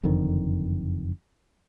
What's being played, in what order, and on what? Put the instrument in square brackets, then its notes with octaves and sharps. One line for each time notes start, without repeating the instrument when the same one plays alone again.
[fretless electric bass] F#1 F2 D3 D#3